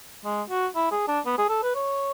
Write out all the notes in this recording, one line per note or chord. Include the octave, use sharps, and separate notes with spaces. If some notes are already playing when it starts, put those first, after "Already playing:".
G#3
F#4
E4
G#4
D4
B3
G#4
A4
B4
C#5